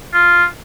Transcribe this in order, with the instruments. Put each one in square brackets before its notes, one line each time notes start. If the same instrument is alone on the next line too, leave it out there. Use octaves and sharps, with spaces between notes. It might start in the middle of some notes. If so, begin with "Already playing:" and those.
[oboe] F4